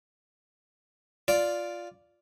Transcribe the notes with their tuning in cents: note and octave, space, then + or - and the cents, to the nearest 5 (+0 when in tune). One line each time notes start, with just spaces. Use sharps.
F4 +0 D5 +0